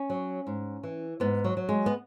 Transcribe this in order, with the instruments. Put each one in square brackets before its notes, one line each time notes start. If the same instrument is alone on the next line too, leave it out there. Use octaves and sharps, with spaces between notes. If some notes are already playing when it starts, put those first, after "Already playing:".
Already playing: [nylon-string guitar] C#4
F#3
G#2
E3
G#2 B3
F#3
F#3
G#3
B3